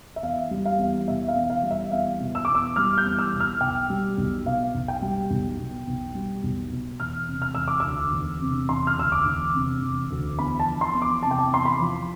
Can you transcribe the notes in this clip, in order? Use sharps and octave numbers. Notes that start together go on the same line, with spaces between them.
E5
E2 F5
G3
F5
E2
B2 E5
F5
E2
F5
G3
E5
E2 F5
B2
E6
E2 D6
E6
G3 F6
G6
E2
E6
B2
F6
B1 G5
G3
B1
B2 F5
B1
G5
G3
B1
B2
B1
G3
B1
B2
E1 F6
C3
F6
E1 E6
D6
D2 E6
E1
C3
E1 C6
F6
D2 E6
D6
E1
C3
E1
D2
E2 B5
A5
F3
C6
E2
D6
C3 A5
G5
A5
E2 C6
B5
F3